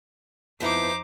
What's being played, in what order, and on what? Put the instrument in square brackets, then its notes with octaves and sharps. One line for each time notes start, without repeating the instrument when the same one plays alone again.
[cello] F2 C5 [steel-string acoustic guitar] F3 B3 E4 [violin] D#4 D6